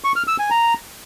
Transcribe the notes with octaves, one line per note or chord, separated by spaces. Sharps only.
C#6
F6
E6
G#5
A#5